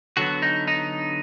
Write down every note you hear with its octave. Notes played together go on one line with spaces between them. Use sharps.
D3 F#3 B3 F#4
D#4
D#4